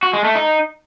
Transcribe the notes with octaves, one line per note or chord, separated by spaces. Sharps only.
F#4
G#3
A3
D#4